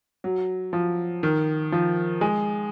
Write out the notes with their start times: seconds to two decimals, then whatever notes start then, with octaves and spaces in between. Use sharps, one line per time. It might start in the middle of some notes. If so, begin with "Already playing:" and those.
0.24 F#3
0.73 F3
1.23 D#3
1.72 F3
2.21 G#3